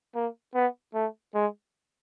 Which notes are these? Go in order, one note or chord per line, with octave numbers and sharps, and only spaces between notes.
A#3
B3
A3
G#3